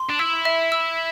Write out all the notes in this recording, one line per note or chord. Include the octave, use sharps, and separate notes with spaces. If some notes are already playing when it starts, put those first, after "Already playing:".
Already playing: C6
D4
E4 E6
E5
E6